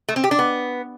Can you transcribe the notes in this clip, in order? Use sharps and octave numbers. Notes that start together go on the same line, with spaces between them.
A3
C4
G4
D4
B3